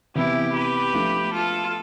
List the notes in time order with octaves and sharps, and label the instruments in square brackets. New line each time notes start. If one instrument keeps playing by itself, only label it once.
[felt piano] C3 E3 B3 [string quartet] E4 G4
[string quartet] G4 B4
[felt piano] F3 A3 D4 A4
[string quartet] F4 A4